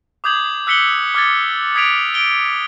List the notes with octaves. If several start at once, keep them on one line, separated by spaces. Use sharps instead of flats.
D6 D#6 G6 G#6 F#7
E6 F#6 B6 C#7 F#7 G7
D6 F6 G#6 A6
D#6 G#6 B6 D7 F7
D7 G7